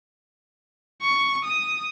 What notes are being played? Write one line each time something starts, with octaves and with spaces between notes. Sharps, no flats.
C#6
D#6